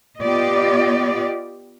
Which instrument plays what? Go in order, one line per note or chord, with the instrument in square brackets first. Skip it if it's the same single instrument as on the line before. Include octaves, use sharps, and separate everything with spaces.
[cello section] B3 F4 G4 D5 D#5